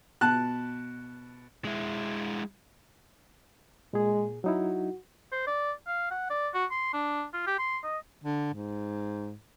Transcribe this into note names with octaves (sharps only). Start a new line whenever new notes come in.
B2 A5 F#6
G#3 E4
A#2 G#3 G#4
F#3 D#4 E4 F#4
C5
D5
F5
F#5
D5
F#4
C6
D4
F4
G4
C6
D#5
D3
G#2